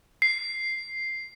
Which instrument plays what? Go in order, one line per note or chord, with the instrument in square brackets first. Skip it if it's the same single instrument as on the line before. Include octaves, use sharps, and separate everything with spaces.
[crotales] C7